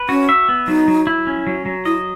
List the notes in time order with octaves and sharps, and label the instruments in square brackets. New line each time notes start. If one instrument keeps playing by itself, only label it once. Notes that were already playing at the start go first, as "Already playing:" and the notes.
Already playing: [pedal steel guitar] B4
[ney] C#4 [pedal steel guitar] F#4
[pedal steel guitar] E5
B3
[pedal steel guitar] F#3 [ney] D#4
[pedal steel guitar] F#3
E4
C#4
F#3
F#3
[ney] E4 [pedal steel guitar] D#5